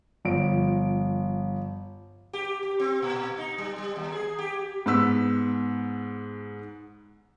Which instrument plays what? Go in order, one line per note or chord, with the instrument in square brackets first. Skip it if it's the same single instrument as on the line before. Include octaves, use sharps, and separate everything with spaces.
[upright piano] G1 F3 D7
[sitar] G4
G4
C4
A#2
D#4
G3
G3
D#2
G#4
G4
[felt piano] G#2 B3 E6 B6